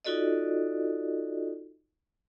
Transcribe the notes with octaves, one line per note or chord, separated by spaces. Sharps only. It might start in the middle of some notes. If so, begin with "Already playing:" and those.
D#4 F4 F#4 A4 D5 D#5